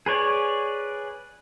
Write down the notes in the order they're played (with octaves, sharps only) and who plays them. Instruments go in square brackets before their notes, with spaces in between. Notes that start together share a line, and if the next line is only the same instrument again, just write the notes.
[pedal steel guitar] G#4 B4 C#5 D5